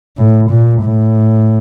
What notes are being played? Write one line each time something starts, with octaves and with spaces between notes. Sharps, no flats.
A2
A#2
A2